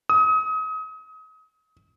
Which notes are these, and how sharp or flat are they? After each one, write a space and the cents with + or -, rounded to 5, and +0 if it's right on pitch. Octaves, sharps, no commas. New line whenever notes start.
D#6 +30